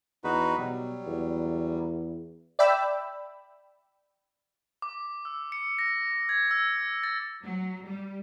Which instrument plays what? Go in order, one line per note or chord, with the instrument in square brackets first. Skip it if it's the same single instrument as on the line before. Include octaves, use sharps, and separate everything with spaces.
[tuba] E2 [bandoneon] D#4 F#4 B4
[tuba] B2 [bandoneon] F#3 G3
[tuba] E2
[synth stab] D5 E5 G5 B5 E6
[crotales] D6
E6
C#7
A#6
G#6
E6
A6
[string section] F#3
G3